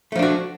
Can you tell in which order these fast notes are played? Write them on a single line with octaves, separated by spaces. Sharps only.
A3 F3 D4 F#4